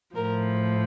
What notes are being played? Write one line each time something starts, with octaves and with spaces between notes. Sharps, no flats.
A2 F3 A#4